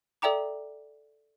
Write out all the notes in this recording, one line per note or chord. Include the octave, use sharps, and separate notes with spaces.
A4 D5 E5 G5 A#5 D6